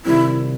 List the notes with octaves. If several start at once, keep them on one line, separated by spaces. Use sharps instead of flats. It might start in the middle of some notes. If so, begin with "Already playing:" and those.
C3 D#3 G3 C4 E4